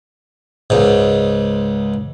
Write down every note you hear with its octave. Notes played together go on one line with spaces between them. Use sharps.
C#2 G#2